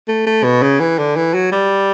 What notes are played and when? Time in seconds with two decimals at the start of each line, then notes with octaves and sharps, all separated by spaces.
0.08 A3
0.26 A3
0.44 B2
0.62 C#3
0.80 E3
0.99 D3
1.16 E3
1.34 F#3
1.52 G3